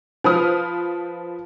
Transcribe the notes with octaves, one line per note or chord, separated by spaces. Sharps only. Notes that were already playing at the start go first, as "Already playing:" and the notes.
F3 B4 C5 D#6 F6